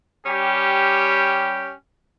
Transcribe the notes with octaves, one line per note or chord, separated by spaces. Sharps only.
G3 C#4 G4